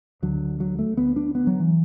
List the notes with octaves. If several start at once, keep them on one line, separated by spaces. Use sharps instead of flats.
D2 D3 F#3
F#3
A3
D2 D3 B3
D4
B3
F#3
E3